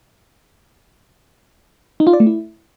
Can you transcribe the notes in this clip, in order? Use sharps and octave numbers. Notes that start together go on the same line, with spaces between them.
D#4
F4
D5
A3
E4